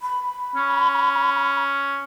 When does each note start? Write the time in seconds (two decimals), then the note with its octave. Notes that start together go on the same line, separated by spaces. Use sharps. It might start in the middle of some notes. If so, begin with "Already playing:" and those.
0.01 B5
0.56 C#4